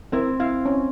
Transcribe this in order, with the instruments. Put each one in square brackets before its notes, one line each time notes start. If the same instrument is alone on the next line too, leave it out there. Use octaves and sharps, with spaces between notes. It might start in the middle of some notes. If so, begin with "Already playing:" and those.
[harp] C4 [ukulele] E4 A#4
[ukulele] E4 [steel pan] F5
[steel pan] C#4